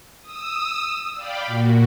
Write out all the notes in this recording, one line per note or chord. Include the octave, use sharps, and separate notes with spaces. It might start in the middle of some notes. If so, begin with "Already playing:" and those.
D#6 E6
D5 F5 G5 B5
A#2 F#4